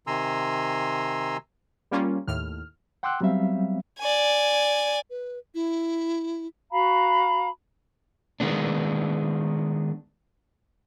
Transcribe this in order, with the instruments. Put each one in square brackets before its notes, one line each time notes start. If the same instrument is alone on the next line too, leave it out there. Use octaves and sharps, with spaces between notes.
[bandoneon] C3 D#3 G#5 A#5 C6 E6
[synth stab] G3 A#3 C#4 F4
D#2 A2 F6
[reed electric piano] F#5 G5 C6 D6 E6 F#6
F#3 G3 B3 C4 E5 F5
[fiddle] D5 G#5
[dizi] B4
E4
[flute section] F#4 F5 A#5 B5
[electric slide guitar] D#3 G#3 B3 D4